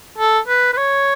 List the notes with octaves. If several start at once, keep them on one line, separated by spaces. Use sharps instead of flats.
A4
B4
B4
C#5